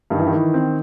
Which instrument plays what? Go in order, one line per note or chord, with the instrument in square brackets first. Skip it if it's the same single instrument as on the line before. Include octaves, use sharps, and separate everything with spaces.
[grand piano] G2 [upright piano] D#3
[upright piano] E3
D#3
[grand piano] E3
C4